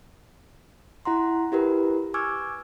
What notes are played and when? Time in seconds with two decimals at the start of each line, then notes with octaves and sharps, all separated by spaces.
1.05 E4 F#5 A#5 C6
1.52 E4 G4 A#4 B4
2.14 G#5 C#6 D6 E6 F6 G#6